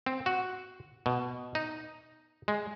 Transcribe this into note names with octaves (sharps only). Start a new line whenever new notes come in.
C4
F#4
B2
D#4
G#3